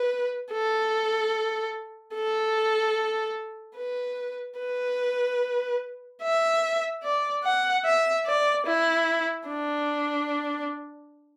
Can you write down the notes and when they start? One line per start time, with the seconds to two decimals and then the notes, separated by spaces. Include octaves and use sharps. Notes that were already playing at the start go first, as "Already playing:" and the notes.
Already playing: B4
0.52 A4
2.15 A4
3.77 B4
4.59 B4
6.22 E5
7.04 D5
7.44 F#5
7.85 E5
8.26 D5
8.67 E4
9.48 D4